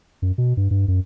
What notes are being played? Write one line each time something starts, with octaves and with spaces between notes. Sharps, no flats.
F#2
B2
G2
G2
F#2